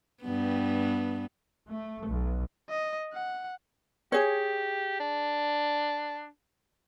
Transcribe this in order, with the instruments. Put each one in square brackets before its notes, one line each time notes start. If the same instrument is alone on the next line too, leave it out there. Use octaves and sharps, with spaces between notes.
[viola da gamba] G2 B3
[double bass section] A3
B1
[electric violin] D#5
F#5
[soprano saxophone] G4 [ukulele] G#4 C#5
[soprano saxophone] D4